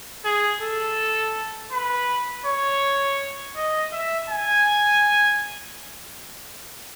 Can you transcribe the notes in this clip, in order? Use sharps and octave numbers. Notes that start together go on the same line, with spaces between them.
G#4
A4
B4
C#5
D#5
E5
G#5